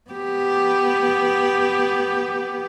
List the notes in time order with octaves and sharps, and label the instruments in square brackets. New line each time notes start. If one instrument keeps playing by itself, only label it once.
[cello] B3 G4